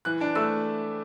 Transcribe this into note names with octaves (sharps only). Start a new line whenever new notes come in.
E3 F#6
D4
A3 E6